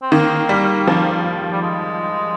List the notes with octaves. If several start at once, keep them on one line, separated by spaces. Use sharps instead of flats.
C4
D#3 A#3
G3
F3
G3
G#3